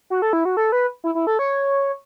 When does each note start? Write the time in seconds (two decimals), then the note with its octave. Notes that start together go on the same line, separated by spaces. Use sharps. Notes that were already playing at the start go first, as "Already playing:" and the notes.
0.10 F#4
0.22 A4
0.33 E4
0.45 F#4
0.57 A4
0.72 B4
1.04 E4
1.15 E4
1.27 A4
1.39 C#5